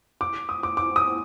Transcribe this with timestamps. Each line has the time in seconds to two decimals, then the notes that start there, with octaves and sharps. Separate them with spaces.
0.21 D6
0.49 D#6
0.63 D6
0.77 D6
0.96 D#6